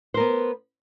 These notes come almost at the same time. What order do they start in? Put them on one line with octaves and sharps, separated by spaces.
C5 A#4 B3